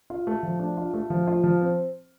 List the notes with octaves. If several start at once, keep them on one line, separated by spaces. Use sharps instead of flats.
F4
A3
F3
D4
F4
A3
F3
F4
F3
C4